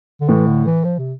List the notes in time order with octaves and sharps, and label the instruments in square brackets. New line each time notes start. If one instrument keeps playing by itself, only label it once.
[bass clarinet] D3
[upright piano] A2 [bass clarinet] E3
[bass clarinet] D3
E3
F3
C3